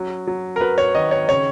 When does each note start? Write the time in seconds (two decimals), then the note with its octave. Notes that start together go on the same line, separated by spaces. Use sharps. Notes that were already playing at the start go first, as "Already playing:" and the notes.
Already playing: F#3 C#4
0.27 F#3
0.56 A#4
0.61 F#3 B4
0.78 C#5
0.95 D#3 D#5
1.11 C#5
1.28 C#3 C#5